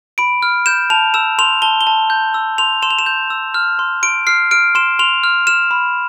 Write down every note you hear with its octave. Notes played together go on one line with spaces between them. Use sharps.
B5 D7
F6
G6 E7
A5 F7
E6 E7
C6 F7
A5 G7
G7
A5
G6
E6
C6 F7
C6 E7
F7
E7
G6
E6
F6
C6
C6 D7
F6 C7
F6 D7
C6 E7
C6 F7
F6
F6 E7
B5